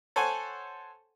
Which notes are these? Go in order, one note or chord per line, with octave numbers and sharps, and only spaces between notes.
A4 C5 C#5 F#5 G#5